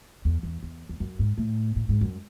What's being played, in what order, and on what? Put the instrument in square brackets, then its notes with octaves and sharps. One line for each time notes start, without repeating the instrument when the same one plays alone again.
[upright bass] E2
E2
E2
E2
F#2
G#2
A2
A2
G#2
F#2